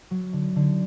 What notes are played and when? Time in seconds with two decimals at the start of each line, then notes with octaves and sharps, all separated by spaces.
0.11 F#3
0.33 D3
0.56 D3